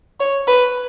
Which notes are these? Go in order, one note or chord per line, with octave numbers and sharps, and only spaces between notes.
C#5
B4